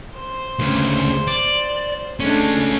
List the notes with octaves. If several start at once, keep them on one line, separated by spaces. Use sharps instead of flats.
C5
D2 C#3
D5
G#3 A3 C#4 D4